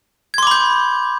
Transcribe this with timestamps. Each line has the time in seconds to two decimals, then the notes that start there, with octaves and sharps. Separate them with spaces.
0.34 G#6
0.38 C6
0.43 D6
0.47 B5
0.51 G6